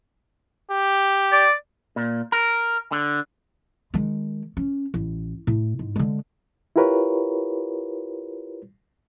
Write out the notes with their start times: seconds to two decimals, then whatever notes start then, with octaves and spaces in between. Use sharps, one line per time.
0.70 G4
1.32 D5
1.96 A#2
2.32 A#4
2.92 D3
3.94 D#3 G#3
4.57 C#4
4.94 A1
5.47 A2
5.79 G#2
5.96 D3 G#3
6.76 E4 F4 G4 A#4 B4 C#5